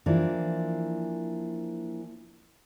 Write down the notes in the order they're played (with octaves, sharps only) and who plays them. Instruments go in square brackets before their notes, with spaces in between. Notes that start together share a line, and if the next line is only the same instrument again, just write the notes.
[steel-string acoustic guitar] E3 F3 A#3 D4